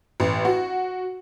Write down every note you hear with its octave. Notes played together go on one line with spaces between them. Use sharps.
A1
F#4